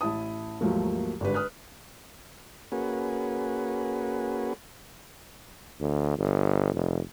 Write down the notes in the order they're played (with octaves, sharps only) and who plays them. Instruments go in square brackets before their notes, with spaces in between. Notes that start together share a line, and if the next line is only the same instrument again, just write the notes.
[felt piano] A1 E4 A5 D#6
D#2 G#2 F3 F#3 A3 A#3
G#1 D3 G3 B4
B4 D#6 F6 F#6
[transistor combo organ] A#3 C#4 F#4 G#4 B4
[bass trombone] D2
G1
F1